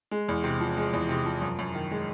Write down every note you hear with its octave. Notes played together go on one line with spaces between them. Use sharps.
G#3
E2
C3
F3
G#3
E2
C3
F3
F#2
F#2
D#3
G#3